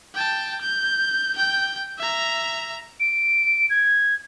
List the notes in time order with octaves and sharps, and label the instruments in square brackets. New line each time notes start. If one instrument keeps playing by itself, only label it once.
[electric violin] G5 A5
G6
G5 G6
E5 A#5
[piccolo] D7
G#6